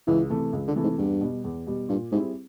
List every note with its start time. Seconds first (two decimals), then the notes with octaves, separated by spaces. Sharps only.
0.07 C#2 E3
0.30 C3 E3 A3
0.53 C#2
0.68 D3
0.75 C3 E3 A3
0.83 G#2
0.98 E2 G2
1.21 B2 G3
1.44 E2
1.67 B2 G3
1.89 G2 A#2
2.12 G#2 G3 C4 E4 G#4